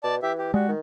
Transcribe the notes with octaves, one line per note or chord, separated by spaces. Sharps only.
B2 D5 A5
E3 G4 E5
G4
G3 G#3 F#4
D#3